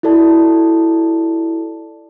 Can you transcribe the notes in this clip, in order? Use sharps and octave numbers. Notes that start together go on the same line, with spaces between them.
E4 F#4 A4 D5 A5